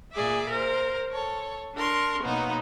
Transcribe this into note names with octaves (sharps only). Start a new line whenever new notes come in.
A#2 G#4 D5 E5
A#4 C5
A4 C#5
D4 A#4 C6 C#6
B2 F#3 A#3 B3 D#4